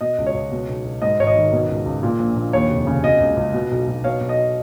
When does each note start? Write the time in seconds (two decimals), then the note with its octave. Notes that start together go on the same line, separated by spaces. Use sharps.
0.01 B2 D#5
0.18 C#2
0.27 C#5
0.34 C#2
0.51 B2
0.69 B1
0.85 B1
1.02 G#2 D#5
1.19 G#1 C#5
1.27 D#5
1.36 D#3
1.53 B2
1.69 C#2
1.86 C#2
2.03 A#2
2.19 A#1
2.36 A#1
2.53 D#2 C#5
2.70 F1
2.87 C#3
3.04 B2 D#5
3.20 C#2
3.37 C#2
3.54 B2
3.71 B1
3.87 B1
4.04 B2 C#5 F5
4.21 B1
4.29 D#5